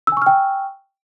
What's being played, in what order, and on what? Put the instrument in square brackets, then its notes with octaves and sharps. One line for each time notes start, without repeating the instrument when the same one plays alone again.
[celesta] E6
G#5
C#6
F6
G5